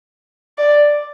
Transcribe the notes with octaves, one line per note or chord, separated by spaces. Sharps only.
D5